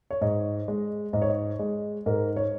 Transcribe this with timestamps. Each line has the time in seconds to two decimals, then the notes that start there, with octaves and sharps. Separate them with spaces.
0.11 C#5
0.21 G#2 D#5
0.68 G#3
1.13 G#2 D#5
1.22 C#5
1.29 D#5
1.59 G#3
2.06 G#2 A#4
2.36 C#5